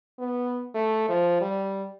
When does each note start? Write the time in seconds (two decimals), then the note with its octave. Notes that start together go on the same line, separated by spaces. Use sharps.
0.19 B3
0.75 A3
1.09 F3
1.41 G3